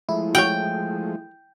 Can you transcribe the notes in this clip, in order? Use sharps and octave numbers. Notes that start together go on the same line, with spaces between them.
F3 G#3 A3 E4
F#4 C#5 G5